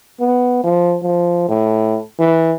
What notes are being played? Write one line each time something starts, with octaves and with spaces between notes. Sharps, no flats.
B3
F3
F3
A2
E3